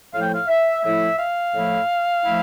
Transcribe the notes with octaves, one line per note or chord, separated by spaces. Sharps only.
A2 F3 A3 E4 F5
G5
F5
E5
A2 F3 A3 E4 E5
F5
A2 F3 A3 E4
F3 A3 E4